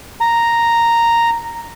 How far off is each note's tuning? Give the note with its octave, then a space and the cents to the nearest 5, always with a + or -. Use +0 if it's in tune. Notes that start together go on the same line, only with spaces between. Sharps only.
A#5 -5